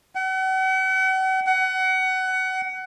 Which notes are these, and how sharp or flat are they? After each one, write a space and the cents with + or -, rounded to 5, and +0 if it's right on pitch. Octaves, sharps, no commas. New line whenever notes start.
F#5 +40
F#5 +25